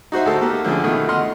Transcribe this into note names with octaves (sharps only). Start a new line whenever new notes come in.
D#4 F#4 C5 E5
D2 A4 A5
A#3 G4
D3 F3 A3 C#4 G#4
B2 D#3 A3
D#5 F#5 C6 F6